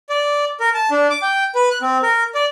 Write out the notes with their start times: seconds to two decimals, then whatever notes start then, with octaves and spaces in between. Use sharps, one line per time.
0.09 D5
0.60 A#4
0.74 A5
0.91 D4
1.10 D6
1.22 G5
1.55 B4
1.71 F#6
1.82 C4
2.03 A#4
2.35 D5